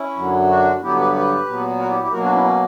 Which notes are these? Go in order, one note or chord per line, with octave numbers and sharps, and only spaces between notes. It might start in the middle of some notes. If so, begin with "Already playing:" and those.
Already playing: C#4 E4
F#2 D3 F#3
D4 F#4
G2 D3 F#3 B3 E4 G4
G4 B4
G4 B4
A#2 F#3 B3
F#4 A#4
E4 G4
E4 G4
B2 F#3 A#3 F#4 A#4
D4 F#4
C#4 E4
C#4